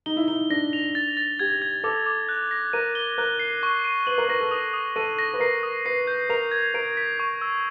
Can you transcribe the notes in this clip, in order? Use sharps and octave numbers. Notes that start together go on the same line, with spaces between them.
D#4 G7
E4
D#4 G7
D4 A#6
F7
A6
A6
G4 G#6
G#6
A4 D6
D6
F#6
A#6
A#4 D#7
G7
A#4 F#6
C7
C#6
D#7
B4 F#7
A#4
A#4 A#6
A4
D#6
D#6
A4 D#7
A#6
B4
A#4 C7
D#6
B4 C7
G6
A#4 F7
G#6
A#4 D7
B6
C#6
E6